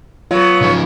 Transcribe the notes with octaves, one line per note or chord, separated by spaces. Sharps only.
F#3 B3 F4
C#3 F3